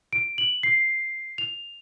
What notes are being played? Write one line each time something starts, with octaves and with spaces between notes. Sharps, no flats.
D7
F#7
C7
F7